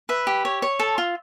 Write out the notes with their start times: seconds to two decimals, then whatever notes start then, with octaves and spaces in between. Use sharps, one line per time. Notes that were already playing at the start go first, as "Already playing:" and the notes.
0.09 B4 E5
0.27 G4
0.45 C#5
0.62 C#5
0.80 A4
0.98 F4